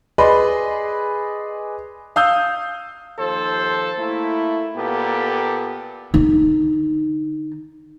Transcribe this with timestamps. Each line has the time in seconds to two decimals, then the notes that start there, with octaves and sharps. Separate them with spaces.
0.18 G#4 B4 D5 D#5 B5 C6
2.16 F5 D#6 E6 G6
3.19 D#2 F3 A4 C5
3.99 A3 A#3 E4
4.76 A#2 A#3 B3 G4 A4
6.14 D3 D#4